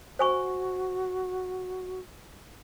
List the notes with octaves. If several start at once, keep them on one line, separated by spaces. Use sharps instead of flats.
F#4 C5 G#5 C#6